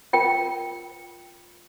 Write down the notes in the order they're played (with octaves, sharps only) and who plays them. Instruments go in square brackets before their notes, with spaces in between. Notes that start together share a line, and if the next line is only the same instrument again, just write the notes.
[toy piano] F4 A#4 G5